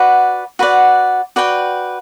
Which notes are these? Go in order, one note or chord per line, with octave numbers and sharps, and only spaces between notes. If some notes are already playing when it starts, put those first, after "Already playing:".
Already playing: F#4 B4 D5 F#5
F#4 B4 D5 F#5
F#4 B4 D5 G5